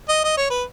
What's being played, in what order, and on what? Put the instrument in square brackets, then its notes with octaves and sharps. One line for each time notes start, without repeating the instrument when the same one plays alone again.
[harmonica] D#5
D#5
C#5
B4